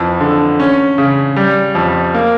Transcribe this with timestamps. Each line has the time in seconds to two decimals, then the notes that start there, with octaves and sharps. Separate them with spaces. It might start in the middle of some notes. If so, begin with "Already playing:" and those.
Already playing: F2 E3
0.21 D3
0.60 C#4
0.98 C#3
1.36 G3
1.75 F2
2.14 A#3